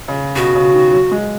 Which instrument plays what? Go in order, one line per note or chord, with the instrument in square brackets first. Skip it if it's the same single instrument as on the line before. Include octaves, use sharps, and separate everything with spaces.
[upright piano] C#3
[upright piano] B2 [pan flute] F#4
[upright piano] C#3
D#3
F#3
G#3